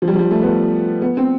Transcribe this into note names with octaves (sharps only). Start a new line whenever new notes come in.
F3
G3
F3
G3
A3
B3
B3
C4